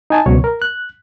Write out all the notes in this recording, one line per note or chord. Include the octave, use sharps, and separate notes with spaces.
D#4 G#5 A5
C#2 B2 F#3 C#5
A#4
F#6